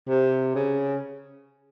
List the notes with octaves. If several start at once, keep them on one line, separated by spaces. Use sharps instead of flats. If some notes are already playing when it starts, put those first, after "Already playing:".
C3
C#3